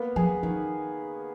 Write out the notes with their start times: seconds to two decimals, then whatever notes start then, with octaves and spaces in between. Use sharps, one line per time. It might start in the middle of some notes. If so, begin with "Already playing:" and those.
Already playing: A#3 B3
0.16 F3 G#4
0.43 D#3 F3